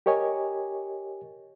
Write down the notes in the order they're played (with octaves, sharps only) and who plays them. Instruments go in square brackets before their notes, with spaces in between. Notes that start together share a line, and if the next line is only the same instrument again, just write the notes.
[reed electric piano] G4 A#4 C#5 D#5 G#5